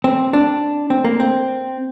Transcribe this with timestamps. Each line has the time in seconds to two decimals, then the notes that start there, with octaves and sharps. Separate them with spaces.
0.04 C4
0.33 D4
0.90 C4
1.04 A#3
1.20 C4